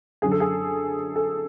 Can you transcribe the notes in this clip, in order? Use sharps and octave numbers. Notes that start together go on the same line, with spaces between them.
F#2 D3 F#3 G#4
A4
G#4
A4